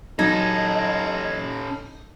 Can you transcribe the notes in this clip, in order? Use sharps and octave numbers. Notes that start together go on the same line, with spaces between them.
F#3 C#4 D#4 A4 D#5 G#6 A#6